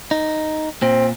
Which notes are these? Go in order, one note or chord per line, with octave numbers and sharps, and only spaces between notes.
D#4
A#2 C4